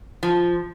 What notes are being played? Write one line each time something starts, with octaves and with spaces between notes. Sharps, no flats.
F3